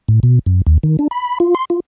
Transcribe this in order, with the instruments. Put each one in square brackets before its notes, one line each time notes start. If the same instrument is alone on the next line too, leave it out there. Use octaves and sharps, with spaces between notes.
[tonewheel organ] A2
B2
F#2
D#2
D#3
D4
B5
F4
C6
F4